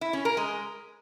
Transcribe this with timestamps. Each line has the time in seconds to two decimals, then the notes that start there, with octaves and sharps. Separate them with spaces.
0.01 E4
0.13 C#4
0.25 A#4
0.37 G#3